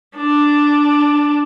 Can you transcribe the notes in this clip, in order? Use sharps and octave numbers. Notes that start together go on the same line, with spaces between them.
D4